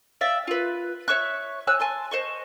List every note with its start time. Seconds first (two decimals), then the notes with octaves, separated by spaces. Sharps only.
0.21 D5 E5 F5 G5
0.47 F4 B4
1.08 C#5 E5 C#6 F#6
1.67 C#5 G#5 E6 F#6
1.80 G#5 A5 C6
2.11 C5 D#5 C#6